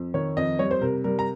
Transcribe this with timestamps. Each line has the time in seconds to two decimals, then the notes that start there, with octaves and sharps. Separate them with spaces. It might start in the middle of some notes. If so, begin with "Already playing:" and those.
Already playing: F2
0.14 D#3 C#5
0.37 F2 D#5
0.59 G3 C#5
0.71 C5
0.81 C3 A#4
1.04 G3 A#4
1.19 A#5